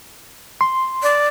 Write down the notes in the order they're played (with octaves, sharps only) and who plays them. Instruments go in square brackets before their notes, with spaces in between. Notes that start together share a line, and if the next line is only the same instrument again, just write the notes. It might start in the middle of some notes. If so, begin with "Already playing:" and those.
[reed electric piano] C6
[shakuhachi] D5